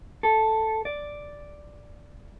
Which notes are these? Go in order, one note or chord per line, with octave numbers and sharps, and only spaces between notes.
A4
D5